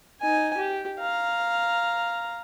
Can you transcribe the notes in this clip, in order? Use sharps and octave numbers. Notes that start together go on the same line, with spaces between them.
D#4 G#5
G4
F5 A#5